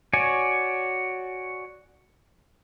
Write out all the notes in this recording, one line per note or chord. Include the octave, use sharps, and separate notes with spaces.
F#4 C#5 D5 G#5